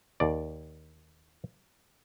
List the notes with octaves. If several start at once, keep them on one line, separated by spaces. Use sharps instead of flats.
D#2 D5